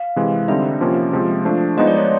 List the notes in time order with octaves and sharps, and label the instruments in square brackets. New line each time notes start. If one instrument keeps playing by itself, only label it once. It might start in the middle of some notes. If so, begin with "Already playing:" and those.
Already playing: [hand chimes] F5
[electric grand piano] C3 E3 G#3
[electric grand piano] D3 G3 C4 D#4 [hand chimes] E5
[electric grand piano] C3 F3 A#3 C#4
C3 F3 G#3 C4
F3 A3 D4
[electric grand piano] F3 G#3 B3 D#4 [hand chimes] D#5
[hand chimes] D5
C#5